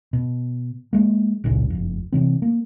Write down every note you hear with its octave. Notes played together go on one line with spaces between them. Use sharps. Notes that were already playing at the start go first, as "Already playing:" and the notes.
B2
F#3 G#3 A#3
G#1 C#2 A#2 C#3
F#1 F2
C3 E3 C4
A#3